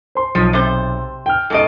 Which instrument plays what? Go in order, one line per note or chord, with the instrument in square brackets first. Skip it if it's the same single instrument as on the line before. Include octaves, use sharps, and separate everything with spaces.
[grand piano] C5 C6
[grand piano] B1 [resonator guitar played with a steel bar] F3
[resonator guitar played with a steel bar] C3 C5
[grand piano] G5 F6
[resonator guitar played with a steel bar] G#2 B2 D#5 [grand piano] A4 D7